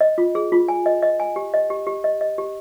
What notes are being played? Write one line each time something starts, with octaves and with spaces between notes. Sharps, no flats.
D#5
F4
G#4
F4
G#5
D#5
D#5
G#5
G4
D#5
G4
G4
D#5
D#5
G4